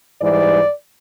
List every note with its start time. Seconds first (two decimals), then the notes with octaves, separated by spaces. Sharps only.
0.20 G#2 E3 G3 D5